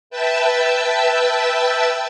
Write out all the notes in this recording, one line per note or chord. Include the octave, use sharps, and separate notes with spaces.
B4 E5 G5 A5 E6